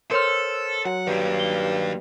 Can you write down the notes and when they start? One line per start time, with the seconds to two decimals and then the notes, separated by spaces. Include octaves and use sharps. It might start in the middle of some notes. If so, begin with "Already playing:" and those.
0.11 A4 A#4 C5 C#5 C6 E6 F6
0.86 F#3 F#5
1.07 G2 D#3 A#3
1.39 G7